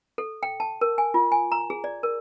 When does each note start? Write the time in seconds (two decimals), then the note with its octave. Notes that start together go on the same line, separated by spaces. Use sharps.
0.18 A4
0.43 G5
0.60 A5
0.81 A#4
0.98 G#5
1.14 F4
1.32 G#5
1.52 A#5
1.70 G#4
1.84 D5
2.03 A#4